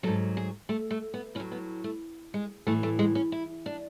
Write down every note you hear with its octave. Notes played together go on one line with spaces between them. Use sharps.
G#2 F#3 A4
G#4
A3
A3
B3
A2 F#3 C#4
B3
A3
G#3
A2 E3 A3
A3
G#3
C#4
E4
D4